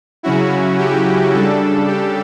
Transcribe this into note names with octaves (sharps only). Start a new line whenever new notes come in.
C#3 F#3 C#4 E4 F#4
G4
C#3 G3 D4 A4
G4